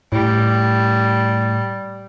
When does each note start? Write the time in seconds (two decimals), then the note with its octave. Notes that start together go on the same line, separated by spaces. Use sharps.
0.12 A2 G3